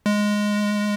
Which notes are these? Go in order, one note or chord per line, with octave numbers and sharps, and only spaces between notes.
G#3